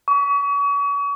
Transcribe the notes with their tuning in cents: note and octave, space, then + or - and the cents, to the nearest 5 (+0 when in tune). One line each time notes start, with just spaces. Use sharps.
C#6 +40